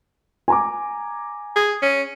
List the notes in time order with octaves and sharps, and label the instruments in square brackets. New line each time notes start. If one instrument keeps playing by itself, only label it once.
[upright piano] G#5 A#5 D6
[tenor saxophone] G#4
C#4